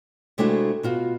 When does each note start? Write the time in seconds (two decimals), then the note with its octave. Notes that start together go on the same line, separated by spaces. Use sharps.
0.38 C3 G#3 A3 D4 E4 F#4
0.83 B2 F4 F#4